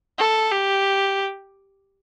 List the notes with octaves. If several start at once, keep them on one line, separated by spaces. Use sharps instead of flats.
A4
G4